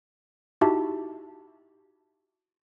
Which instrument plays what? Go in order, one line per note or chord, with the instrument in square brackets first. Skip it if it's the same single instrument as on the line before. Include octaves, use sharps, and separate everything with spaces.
[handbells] D#4 E4 F#4 G4 E5 A5